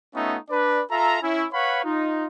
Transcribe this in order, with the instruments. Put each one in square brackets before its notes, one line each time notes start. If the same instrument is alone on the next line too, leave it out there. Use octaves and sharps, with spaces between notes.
[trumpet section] A3 B3 C#4 D#4 F4 E5
D4 B4 D5
F4 A4 E5 A#5
C#4 E4
B4 C#5 F5 F#5 B5 C#6
D#4 F4